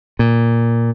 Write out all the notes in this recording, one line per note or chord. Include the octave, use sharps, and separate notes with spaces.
A#2